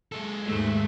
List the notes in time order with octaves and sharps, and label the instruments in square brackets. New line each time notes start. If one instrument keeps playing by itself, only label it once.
[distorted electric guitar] G#3 A4
[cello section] D#2 G#2 A3